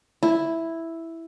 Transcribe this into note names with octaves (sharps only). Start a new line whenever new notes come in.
E4